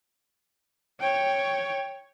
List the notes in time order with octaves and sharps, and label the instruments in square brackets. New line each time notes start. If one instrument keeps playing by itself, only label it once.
[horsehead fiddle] C#5 G5